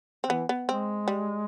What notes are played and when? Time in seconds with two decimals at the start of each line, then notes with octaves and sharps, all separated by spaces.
0.24 C4
0.30 E3 B3
0.49 B3
0.68 G#3 C4
1.08 G3